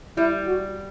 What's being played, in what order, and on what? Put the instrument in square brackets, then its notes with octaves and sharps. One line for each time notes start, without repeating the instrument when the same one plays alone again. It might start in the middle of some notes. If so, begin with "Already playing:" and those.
[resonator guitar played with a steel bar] G3 [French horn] E4
[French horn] F#4